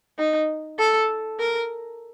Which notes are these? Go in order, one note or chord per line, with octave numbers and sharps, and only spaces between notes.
D#4
A4
A#4